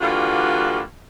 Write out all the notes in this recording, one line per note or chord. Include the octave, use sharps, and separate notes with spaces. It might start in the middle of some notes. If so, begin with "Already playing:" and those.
D3 E3 G3 A#3 F4 F#4